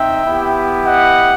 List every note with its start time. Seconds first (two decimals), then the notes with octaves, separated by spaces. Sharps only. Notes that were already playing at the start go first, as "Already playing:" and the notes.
Already playing: C4 D#4 E5 G5
0.25 B3 E4 G4
0.86 D#5 F#5